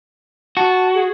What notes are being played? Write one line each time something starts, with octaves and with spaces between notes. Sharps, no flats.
F#4 A5
G#4